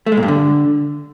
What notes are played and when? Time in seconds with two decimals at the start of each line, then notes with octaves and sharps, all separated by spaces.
0.06 A3
0.12 G#3
0.17 A#2
0.23 G2
0.28 D3